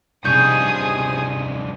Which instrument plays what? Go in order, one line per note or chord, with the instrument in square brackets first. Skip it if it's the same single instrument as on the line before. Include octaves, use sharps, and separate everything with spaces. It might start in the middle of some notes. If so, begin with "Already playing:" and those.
[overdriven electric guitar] G2 F3 [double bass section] C3 [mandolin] D#4 C#6 G6 [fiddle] G#4 D#6